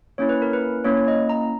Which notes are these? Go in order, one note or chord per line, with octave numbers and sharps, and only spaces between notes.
A#3 C#4 E4 C#5
B4
A#4
B4
A#3 C#4 E4 C#5
D#5
A#5